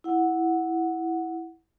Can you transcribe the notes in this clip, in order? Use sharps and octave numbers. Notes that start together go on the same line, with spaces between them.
E4 F#5